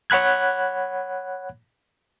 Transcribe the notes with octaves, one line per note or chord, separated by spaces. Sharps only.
C#5 F#5 B5 F#6 G#6